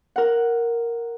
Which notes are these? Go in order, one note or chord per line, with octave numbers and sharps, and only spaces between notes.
A#4 F#5